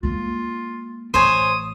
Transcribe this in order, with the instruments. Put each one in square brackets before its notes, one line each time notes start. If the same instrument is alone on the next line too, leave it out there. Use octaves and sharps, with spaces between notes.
[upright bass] G#3 A#3 [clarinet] F4
[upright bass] A1 [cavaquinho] C5 C#5 G#5 [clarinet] D#6